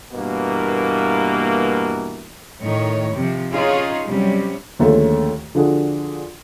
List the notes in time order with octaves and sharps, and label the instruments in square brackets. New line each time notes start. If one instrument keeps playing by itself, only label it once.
[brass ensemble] G2 B2 E3 A#3
[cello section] A2 D#3 C#5
C3 F3
C#4 D#4 F4 G#4 C#5
C3 F#3 G3 C#4
[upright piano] D#2 D3 F3 G#3 A3 C#4
D3 F3 D4 F4 F#4 G#4